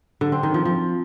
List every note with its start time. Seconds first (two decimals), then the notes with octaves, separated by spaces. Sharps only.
0.21 D3
0.32 C4
0.43 D#3
0.54 F3
0.65 F3